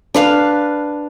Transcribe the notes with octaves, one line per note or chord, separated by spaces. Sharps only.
D4 B4 F5